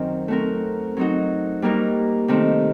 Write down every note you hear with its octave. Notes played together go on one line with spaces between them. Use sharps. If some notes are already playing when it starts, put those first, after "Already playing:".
Already playing: F#2 D#3 F#3 C4
F#3 A3 C4 F#4 A#4
F#3 C4 D#4 F#4
G3 A#3 D#4 F#4 A#4
C3 D#3 A3 C4